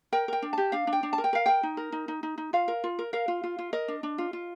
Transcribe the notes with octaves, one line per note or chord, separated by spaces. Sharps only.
A#4 G5
A#4 G5
D4
G4 A5
D4 F5
D4
G5
D4
A5
A#4
G5
A#4 F5
A#4 G5
D#4
A#4
D#4
D#4
D#4
D#4
F4 F5
A#4
F4
A#4
A#4 F5
F4
F4
F4
A#4 D#5
D4
D4
F4
F4